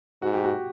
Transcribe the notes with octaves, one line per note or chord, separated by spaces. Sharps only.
G#2 F#4
G4
F#4